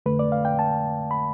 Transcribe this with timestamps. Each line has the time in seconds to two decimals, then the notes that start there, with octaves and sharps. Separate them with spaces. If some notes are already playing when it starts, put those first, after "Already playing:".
0.06 F2 D3 A3 B4
0.19 D5
0.32 F5
0.45 G5
0.59 A5
1.11 B5